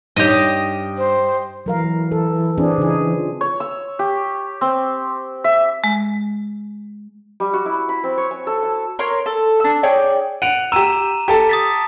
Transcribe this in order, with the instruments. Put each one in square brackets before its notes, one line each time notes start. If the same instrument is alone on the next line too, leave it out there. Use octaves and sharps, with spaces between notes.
[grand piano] G2 [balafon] D#4 C#5 [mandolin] G4 D#5
[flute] C5
[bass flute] E3 [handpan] F#3 A#4 F5
[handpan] A4
C4 D4 G#4
C#3 D#4 G#4
[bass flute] F4
[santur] C#5
E6
G4
C4
E5
[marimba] G#3
[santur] G3
F#4
E4
B5
C4
C#5
G#5
A4
A5
[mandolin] A#4 C#5 C6
A4
D4 E6
G#4 C#5 D5 G5
[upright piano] F#5 D7 [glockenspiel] D#7 F7
[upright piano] G4 E6 [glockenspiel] A#5 D#7 E7
[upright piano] G4 A4 A5
[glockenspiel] D#6 A6 B6